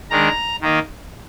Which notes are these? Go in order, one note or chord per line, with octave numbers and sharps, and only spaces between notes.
D#3 G#3 D4 A#5
D#3 A#3 D#4